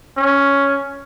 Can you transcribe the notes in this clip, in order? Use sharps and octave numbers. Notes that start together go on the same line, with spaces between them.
C#4